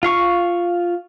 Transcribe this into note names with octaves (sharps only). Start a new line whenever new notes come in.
F4 F5 C#6